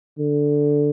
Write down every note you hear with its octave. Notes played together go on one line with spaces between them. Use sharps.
D3